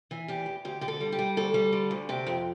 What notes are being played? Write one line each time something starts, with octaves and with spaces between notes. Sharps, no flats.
E3
E2 G4
E2
D2 G4
D3 G4
A4
G3
G4
G3
D2 A4
G3
D3
D2
C3 G4
F2